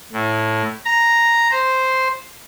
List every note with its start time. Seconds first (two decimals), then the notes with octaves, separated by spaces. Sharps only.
0.12 A2
0.85 A#5
1.51 C5